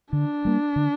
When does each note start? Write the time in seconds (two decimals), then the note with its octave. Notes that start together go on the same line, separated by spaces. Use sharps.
0.13 D3 D4
0.45 G3 A#3
0.76 D3